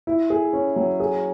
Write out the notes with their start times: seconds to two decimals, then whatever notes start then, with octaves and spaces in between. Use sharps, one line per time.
0.07 E4
0.30 G#4
0.53 C#4
0.76 F#3
1.00 G#4